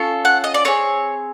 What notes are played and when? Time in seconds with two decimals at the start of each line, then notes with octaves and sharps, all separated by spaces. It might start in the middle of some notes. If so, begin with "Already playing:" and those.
Already playing: C#4 F4 A4
0.25 F#5
0.44 D#5
0.54 D5
0.65 C4 F4 G#4 C#5